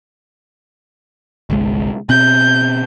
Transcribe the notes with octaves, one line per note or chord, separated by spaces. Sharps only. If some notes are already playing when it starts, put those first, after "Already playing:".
G1 C2 G#3
B2 C4 G6